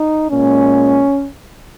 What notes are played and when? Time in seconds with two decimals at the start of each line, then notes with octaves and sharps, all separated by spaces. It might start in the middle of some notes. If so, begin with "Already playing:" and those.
Already playing: D#4
0.31 A#2 G#3 C#4